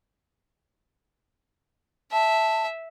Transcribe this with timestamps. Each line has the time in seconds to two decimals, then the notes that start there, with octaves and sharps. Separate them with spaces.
2.12 E5 A5